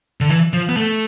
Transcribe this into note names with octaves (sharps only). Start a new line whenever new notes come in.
D3
E3
F3
B3
A3